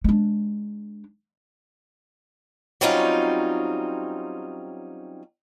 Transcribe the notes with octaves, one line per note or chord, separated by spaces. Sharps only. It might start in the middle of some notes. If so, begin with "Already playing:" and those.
G#3 D4
F#3 G3 C4 C#4 D#4 F4